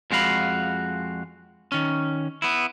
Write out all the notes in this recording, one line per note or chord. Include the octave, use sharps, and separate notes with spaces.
F2 G#3 F#4 F5 B5
D#3 C#4
B3 E4